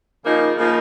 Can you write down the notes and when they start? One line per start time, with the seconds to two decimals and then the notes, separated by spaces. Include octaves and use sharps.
0.23 C#3 F3 A#3 D#4
0.57 C#3 F3 A#3 D#4